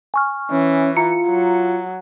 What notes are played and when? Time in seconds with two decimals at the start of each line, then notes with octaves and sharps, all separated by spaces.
0.14 G#5 C#6 F6
0.52 E3 C#4
0.97 F4 A#5 C#7
1.28 F#3